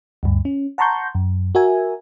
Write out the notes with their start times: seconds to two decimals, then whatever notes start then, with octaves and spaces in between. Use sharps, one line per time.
0.23 D2 G2
0.45 C#4
0.78 F#5 A5 A#5 C6 C#6 G6
1.15 F#2
1.55 F#4 A#4 E5 G#5